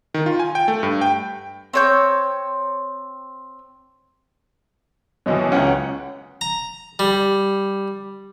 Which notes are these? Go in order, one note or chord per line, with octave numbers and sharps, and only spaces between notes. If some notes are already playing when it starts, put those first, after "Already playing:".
D#3
F4
G#5
G5
A3
G2
G5
C4 C#5 G6
F#2 B2 E3 C#5 D#5
C#2 C#4 F#5 G5
A#5
G3